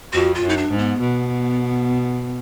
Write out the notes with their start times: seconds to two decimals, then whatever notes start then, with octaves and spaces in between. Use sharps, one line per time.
0.13 F2 F#4
0.35 F4
0.42 F#2
0.49 D#4
0.57 D4
0.71 G#2
0.78 B3
1.00 B2